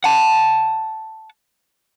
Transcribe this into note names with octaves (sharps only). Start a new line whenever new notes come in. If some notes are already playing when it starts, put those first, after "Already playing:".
F#5 A5